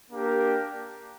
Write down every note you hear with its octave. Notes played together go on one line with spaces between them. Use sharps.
A#3 D4 G4 A#4